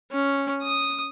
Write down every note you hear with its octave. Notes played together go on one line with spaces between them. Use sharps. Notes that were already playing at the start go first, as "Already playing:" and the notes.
C#4
D#6